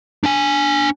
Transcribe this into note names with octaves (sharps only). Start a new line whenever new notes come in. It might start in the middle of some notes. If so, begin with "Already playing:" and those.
D4 G#5